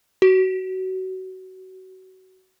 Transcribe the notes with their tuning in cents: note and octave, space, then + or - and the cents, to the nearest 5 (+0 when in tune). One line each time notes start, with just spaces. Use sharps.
F#4 +25